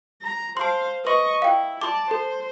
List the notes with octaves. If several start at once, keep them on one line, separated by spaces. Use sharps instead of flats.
A#5
C5 F5 A5 C6
B4 D#5 C6 C#6
E4 F5 G5
D5 A5 C6 D6
A4 C5